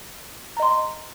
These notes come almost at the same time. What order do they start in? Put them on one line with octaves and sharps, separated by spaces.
A#5 D#5 C6